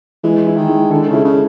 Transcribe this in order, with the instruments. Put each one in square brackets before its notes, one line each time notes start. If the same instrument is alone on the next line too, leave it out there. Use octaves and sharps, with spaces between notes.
[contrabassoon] E3 [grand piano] G#3
[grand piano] E4
[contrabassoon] D#3
[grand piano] G#3
[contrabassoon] D3 [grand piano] A4
[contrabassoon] C#3
[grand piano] E4
[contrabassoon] C#3